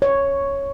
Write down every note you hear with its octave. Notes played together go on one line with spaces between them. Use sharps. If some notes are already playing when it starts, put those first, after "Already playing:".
C#5